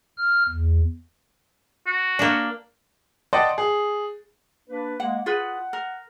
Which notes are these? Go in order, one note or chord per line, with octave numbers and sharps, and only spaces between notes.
F6
E2
F#4
A#3 D4
D5 D#5 F#5 G5 A5 C6
G#4
A#3 D4 B4
G#3 A#3 F#5
F4 G#4 B4 F#5
A#4